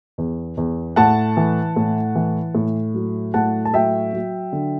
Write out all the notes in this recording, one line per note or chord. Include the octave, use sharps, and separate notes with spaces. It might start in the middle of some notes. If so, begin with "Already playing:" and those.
E2
E2
A2 F#5 A5
E3
A2
E3
A2
F#3
A2 F#5 A5
A5
F#3 E5 G5
F#3
D3